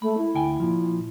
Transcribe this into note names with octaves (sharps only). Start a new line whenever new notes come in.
A3 B5
E4
D2 G5 G#5
A#2 F3